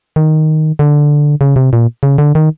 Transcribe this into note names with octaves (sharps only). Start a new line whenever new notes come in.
D#3
D3
C#3
C3
A#2
C#3
D3
D#3